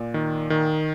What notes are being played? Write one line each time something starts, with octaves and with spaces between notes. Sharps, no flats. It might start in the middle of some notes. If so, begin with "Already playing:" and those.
Already playing: A#2 D5
D#3
D#3